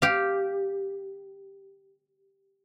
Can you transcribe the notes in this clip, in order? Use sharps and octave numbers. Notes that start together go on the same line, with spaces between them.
G4 F5